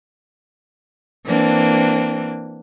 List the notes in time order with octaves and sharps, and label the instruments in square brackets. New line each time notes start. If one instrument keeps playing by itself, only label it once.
[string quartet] E3 A#3 C4 D4